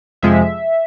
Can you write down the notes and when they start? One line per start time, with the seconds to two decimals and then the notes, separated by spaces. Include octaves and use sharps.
0.22 F2 C3 F3 G#3 E5